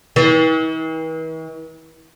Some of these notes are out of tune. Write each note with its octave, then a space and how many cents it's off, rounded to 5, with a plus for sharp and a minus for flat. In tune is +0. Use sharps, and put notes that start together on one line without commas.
E3 -45